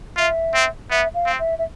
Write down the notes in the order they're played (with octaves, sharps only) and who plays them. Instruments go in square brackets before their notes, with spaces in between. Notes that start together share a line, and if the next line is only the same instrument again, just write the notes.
[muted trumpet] F4 [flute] E5
[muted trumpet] C4
[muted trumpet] B3 [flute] E5
[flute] F5
[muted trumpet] C4
[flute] E5
E5